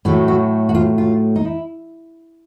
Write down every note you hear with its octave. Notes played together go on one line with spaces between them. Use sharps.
A2 F#3 A3 F#4
F#4
F#4
F4
F4
D#4
E4